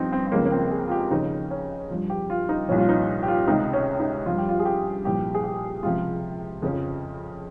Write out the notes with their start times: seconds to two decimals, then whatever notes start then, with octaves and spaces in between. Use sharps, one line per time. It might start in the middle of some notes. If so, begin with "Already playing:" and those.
Already playing: G2 F3 C4 D#4
0.12 C4
0.27 C4
0.32 C#2 C#3 F3 A#3
0.46 A#3
0.52 C4
0.71 G#4
0.87 F4
0.91 G4
1.11 D#2 C#3 F3 D#4
1.51 C#4
1.90 G2 F3
2.10 G4
2.30 F4
2.49 D#4
2.68 C2 A#2 F3 C#4
2.78 F4
2.89 D#4
3.23 G4
3.28 F4
3.47 C#2 C3 D#3 D#4
3.73 C#4
4.00 D#4
4.26 G2 F3 F4
4.38 G4
4.49 F4
4.59 G#4
4.65 G4
5.05 C2 A#2 F3 G4
5.35 G#4
5.44 G4
5.83 C#2 C3 F3 F4
6.62 F2 C#3 F3